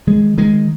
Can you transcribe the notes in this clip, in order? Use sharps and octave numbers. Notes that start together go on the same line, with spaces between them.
D#3 G#3
D#3 G#3